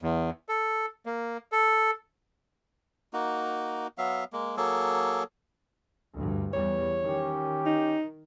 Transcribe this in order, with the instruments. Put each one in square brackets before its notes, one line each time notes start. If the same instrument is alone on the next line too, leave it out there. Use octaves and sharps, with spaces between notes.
[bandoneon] E2
A4
A#3
A4
[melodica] A#3 D#4 F#4
F#3 B3 E5 F5
G#3 A#3
F#3 A#3 G#4 A4
[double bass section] D2 G2
[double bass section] E2 E3 G3 [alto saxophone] C#5
[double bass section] D#3 [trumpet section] C#4 G4
[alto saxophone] D#4